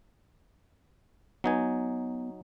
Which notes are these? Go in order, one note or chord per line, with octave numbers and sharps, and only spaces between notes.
F#3 B3 D#4 G#5